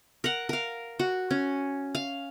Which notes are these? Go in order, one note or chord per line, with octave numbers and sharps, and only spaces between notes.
A#4 F#5
A#4 F5
F#4
C#4
F5